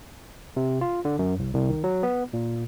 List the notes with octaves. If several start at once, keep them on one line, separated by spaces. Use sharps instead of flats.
C3
F4
D3
F#2
C2
C2
D#3
F#3
B3
A#2